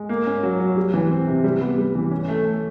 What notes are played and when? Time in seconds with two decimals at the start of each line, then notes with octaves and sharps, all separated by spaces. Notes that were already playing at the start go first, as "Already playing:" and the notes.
Already playing: G#3
0.09 A#3
0.27 C#4
0.43 F#3
0.60 F#3
0.77 G3
0.94 E3
1.10 C4
1.27 C3
1.44 G3
1.61 B3
1.78 G3
1.95 E3
2.11 C#4
2.28 A3
2.45 A3